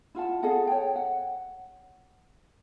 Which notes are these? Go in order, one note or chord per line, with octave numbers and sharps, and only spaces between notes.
E4 F4 F#5 A5
G#4 A4 D#5 F#5
C#5 G5
F#5